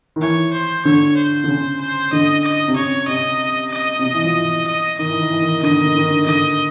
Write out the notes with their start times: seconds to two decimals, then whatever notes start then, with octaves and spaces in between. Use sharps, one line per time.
0.16 D#3
0.21 E3 C#5
0.53 C5
0.85 D3 C#5
1.17 C5
1.44 D3
1.48 C#3
1.81 C5
2.12 D3 D#5
2.44 D#5
2.68 C3
2.76 C#3 C#5
3.08 C3 D#5
3.72 D#5
3.99 C3
4.03 B2
4.14 E3
4.25 F3
4.35 E3
4.67 D#5
4.99 D#3 D#5
5.10 E3
5.20 D#3
5.31 E3
5.42 D#3
5.63 D3 D#5
5.75 D#3
5.86 D3
5.98 D#3
6.10 D3
6.26 D3 D#5